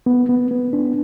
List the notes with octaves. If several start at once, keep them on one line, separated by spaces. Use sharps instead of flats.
B3
B3
B3
D4